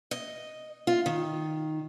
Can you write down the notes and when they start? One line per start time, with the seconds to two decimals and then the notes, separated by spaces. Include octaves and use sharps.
0.11 D#5
0.87 F4
1.06 D#3